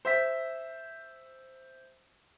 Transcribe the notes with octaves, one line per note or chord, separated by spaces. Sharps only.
C5 E5 B6